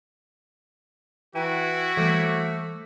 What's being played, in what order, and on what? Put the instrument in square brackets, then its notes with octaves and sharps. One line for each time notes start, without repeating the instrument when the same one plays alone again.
[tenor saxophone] E3 [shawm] E4 [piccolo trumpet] F#4 [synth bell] G5
[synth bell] E3 D6 G6 [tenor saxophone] A3